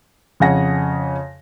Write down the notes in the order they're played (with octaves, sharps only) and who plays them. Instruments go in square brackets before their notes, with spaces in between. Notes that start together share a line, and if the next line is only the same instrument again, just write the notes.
[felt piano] F2 C#3 C#5 F#5 G#5 A#6